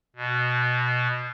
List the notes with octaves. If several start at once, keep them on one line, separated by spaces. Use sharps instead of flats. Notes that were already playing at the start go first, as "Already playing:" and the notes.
B2